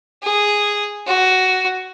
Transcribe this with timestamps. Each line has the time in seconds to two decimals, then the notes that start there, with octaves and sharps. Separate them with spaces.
0.23 G#4
1.07 F#4